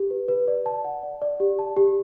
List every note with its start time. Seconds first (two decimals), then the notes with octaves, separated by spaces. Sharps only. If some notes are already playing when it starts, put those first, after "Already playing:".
Already playing: G4
0.11 B4
0.28 B4
0.48 D5
0.66 A5
0.85 F#5
1.03 D5
1.22 D5
1.40 G4
1.59 A5
1.77 G4